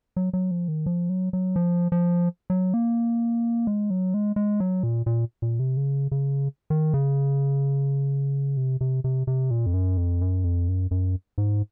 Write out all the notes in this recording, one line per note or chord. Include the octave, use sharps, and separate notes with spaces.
F#3
F#3
F3
D#3
F3
F#3
F#3
F3
F3
F#3
A#3
G#3
F#3
G#3
G#3
F#3
A#2
A#2
A#2
C3
C#3
C#3
D#3
C#3
C3
C3
C3
C3
A#2
F2
F#2
F2
F#2
F2
F#2
F#2
G#2